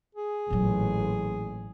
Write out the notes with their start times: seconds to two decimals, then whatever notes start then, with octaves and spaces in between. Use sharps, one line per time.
0.15 G#4
0.50 A1 A#2 F#3